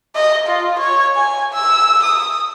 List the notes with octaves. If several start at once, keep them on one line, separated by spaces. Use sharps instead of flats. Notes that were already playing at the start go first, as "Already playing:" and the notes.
D#5
F4
C#5
G#5
E6
D#6